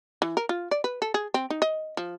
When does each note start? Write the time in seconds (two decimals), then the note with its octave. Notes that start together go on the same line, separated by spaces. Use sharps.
0.22 E3
0.37 A#4
0.49 F4
0.71 D5
0.84 B4
1.02 A4
1.14 G#4
1.34 C4
1.50 D#4
1.62 D#5
1.97 F3